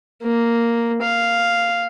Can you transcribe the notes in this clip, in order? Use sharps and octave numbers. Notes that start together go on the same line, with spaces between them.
A#3
F5